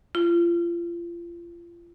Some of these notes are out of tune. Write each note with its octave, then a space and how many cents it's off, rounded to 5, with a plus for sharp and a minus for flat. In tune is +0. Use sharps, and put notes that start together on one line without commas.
F4 -30